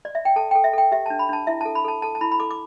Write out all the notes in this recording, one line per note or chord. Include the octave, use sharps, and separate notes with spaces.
D5
E5
G5
A4 A5
A4 G5
E5
A4 G5
G4 E5
D4 A5
B5
D4 A5
E4 E5
A4 A5
B5
A4 A5
A4 A5
A5
E4 B5
B5
A4 D6
D6